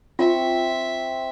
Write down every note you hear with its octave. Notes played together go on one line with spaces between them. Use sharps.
C4 F4 E5 C#6